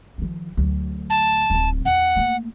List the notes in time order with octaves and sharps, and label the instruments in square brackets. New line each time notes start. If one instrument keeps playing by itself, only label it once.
[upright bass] D#3 F3
D2 F#3
[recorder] A5
[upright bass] D1 C4
[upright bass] E2 [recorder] F#5
[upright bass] A3 A#3